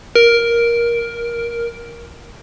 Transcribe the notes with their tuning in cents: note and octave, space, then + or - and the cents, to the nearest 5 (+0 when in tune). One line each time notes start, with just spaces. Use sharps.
A#4 +10